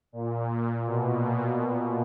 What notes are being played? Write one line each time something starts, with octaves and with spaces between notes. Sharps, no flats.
A#2
B2